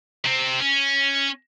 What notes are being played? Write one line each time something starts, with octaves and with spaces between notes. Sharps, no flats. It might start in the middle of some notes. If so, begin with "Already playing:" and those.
C3 C4
C#4